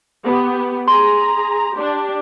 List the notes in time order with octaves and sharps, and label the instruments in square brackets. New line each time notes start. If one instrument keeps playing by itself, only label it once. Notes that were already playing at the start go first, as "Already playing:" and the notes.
[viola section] B3 G4
[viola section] G#4 A#5 [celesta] C6
[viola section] D4 G4